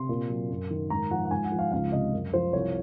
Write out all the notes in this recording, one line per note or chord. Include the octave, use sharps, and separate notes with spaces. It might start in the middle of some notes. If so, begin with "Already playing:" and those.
Already playing: C3 C6
A#2
F#3
F#2
D#3
G#2 A#5
F3 F#5
F#5
G#2 G#5
F#5
F3
F5
C#2 F5
C3 D#5
F#2
F3 C5
C2 C#5